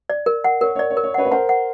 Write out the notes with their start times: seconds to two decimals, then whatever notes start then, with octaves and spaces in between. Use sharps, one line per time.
0.10 D5
0.26 A#4
0.44 F#5
0.61 A#4 C#5
0.76 C#5
0.79 D5
0.90 C#5
0.97 A#4
1.03 C#5
1.14 B4 C#5 F#5
1.25 B4
1.31 A#4 C5 F#5
1.49 F#5